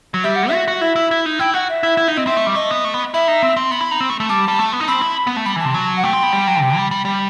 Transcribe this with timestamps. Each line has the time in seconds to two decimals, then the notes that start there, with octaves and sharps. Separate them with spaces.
0.14 F#3
0.24 G3 E5
0.36 F#5
0.48 F#4 E5
0.68 F#4
0.81 E4 E5
0.96 E4
1.11 E4
1.26 D#4
1.39 E4 G5
1.54 F#4 F#5
1.69 E5
1.83 E4
1.97 E4
2.08 D#4
2.16 C4 D#5
2.27 C4 E5
2.37 A3
2.46 G3
2.55 A3 D#5
2.71 B3
2.85 A3
2.94 B3
3.14 E4 E5
3.28 D#4
3.42 C4
3.57 C4
3.71 B3 B5
3.81 E4
3.91 D#4
4.00 C4
4.10 A3
4.20 A3
4.29 G3 A5
4.48 G3
4.59 A3
4.73 B3
4.81 D#4
4.88 C4 B5
5.02 E4
5.27 B3
5.36 A3
5.46 G3 B5
5.56 E3 A5
5.65 C3
5.74 F#3
5.97 F#5
6.03 A3 G5
6.13 C4
6.23 B3
6.33 G3
6.47 F#3
6.61 C3
6.77 G3
6.91 G3
7.05 G3